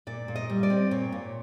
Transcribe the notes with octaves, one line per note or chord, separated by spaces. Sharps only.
A#2 D5
A#2
D#5
G3
D5
C4
A#2 C#5
A#2